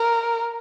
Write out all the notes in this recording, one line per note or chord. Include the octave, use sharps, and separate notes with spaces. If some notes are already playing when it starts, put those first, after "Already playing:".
Already playing: A#4